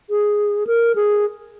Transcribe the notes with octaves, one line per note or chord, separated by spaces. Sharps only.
G#4
A#4
G#4